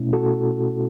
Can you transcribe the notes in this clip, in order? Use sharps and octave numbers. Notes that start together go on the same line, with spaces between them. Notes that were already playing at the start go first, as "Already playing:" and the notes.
Already playing: B2 A3 C#4 E4
F#4 A4